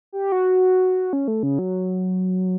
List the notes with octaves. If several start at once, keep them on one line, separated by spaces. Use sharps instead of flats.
G4
F#4
C#4
A3
C#3
F#3